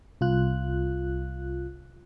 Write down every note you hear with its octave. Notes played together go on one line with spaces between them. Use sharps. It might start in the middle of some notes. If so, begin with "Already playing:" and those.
C2 F4 F#6